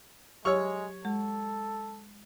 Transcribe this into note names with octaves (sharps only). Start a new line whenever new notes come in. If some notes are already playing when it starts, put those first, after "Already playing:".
F#3 G#3 G4 C#5 C#6 E6
G#3 A4